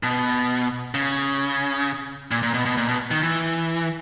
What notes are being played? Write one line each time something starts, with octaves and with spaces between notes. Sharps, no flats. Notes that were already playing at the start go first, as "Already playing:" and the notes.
B2
C#3
A#2
A#2
B2
B2
A#2
B2
D#3
E3